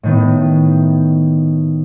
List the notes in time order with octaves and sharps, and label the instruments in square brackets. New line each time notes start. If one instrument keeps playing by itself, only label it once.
[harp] A2 D#3 B3